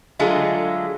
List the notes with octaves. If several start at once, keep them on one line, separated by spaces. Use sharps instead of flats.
D3 F#3 G#3 A3 F4 G#4